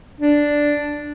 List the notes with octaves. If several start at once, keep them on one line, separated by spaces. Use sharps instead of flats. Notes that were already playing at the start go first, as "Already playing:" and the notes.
D4